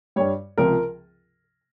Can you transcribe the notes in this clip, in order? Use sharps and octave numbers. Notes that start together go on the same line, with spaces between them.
G2 G3 C#5
C#2 C3 F3 A#4